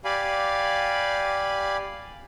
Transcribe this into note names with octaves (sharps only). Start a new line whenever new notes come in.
G4 D5 F5 G#5 B5